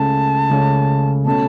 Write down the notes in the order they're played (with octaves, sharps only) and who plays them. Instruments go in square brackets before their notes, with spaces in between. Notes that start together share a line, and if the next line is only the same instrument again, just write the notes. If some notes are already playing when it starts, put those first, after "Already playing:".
Already playing: [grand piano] C#2 C#3 A3 C#4 [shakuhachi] A5
[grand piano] C#2 C#3 A3 C#4
[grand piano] B2 A3 C#4 [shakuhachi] A5